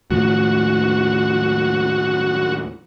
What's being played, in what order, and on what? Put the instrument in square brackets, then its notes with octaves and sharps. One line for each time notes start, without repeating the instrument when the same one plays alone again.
[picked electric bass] D#2 A2 F3 [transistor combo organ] F#4